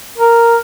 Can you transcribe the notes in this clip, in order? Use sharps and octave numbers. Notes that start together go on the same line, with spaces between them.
A#4